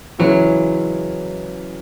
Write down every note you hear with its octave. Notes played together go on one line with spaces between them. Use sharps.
C#3 E3 F#3 G#3 C#4 E4